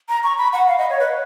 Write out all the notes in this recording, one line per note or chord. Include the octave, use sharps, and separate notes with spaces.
A#5
C#6
B5
F#5
F5
D#5
C#5
B4